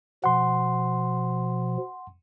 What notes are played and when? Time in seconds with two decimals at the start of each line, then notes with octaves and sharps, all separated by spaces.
0.24 B2 F3 F#5 C6